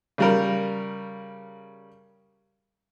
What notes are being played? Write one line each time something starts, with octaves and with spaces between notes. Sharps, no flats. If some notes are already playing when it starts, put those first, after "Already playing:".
C#3 G3 A#4